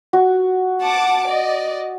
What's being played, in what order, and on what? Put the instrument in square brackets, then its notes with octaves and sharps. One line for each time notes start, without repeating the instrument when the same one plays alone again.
[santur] F#4
[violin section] F#5 A5 D6
D5 D#5